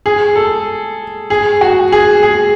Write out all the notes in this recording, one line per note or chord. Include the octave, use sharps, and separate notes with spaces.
G#4
A4
G#4
F#4
G#4
G#4